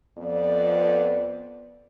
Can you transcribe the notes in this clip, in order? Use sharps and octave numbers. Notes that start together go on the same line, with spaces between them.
F2 B3 D5